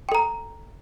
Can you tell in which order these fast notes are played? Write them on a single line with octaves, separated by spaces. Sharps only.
G5 A4 A#5